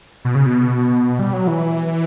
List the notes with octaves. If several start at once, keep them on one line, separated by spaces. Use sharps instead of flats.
B2
C#3
B2
G3
F#3
E3